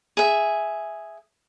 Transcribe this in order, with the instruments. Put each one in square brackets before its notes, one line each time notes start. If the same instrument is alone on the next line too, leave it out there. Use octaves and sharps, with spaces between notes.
[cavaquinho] G#4 E5